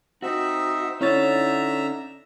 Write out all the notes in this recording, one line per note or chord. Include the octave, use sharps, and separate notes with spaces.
C4 D#4 F#4 E5
D3 C#4 D#4 E4 C#5 E5 A#5 A6